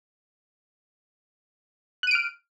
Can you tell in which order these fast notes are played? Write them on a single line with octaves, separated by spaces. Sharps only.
F#6 D#7 D7 F6